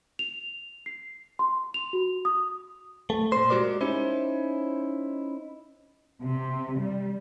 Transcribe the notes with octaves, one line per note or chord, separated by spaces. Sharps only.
F7
C7
C6
F7
F#4
D#6
A3
A#2 C5
G#3 F#4 G4 A#4 D5
C#4 D#4 E4 C5
C3
G3